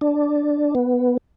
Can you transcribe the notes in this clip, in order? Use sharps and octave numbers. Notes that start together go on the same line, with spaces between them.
D4
B3